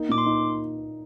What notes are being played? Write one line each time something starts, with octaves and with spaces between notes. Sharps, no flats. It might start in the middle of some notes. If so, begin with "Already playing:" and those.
Already playing: A#3 D#4
A#2 D6
C6
D#4